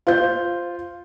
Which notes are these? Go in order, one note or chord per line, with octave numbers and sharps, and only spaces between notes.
F4 C5 G6